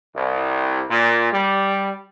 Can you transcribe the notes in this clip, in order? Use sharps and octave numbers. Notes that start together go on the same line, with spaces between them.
C2
A#2
G3